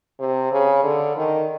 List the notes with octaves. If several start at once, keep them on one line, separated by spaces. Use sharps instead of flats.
C3
C#3
D3
D#3